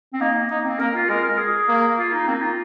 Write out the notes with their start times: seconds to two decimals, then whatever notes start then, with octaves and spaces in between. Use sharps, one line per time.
0.13 C4
0.21 A#3 D#4
0.50 A#3 D#4
0.65 C4
0.79 A#3 A#4
0.95 F4
1.09 G#3 A#4
1.24 A#4
1.38 G#4
1.68 A#3
1.97 F4
2.12 D#4
2.27 A#3 C4
2.33 D#4
2.41 F4